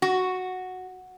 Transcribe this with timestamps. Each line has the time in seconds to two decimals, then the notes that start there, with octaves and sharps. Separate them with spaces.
0.02 F#4